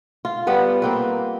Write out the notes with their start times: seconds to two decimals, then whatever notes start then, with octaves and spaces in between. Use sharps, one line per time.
0.25 F4
0.47 G3 B3 B4
0.82 A#3 C4 B4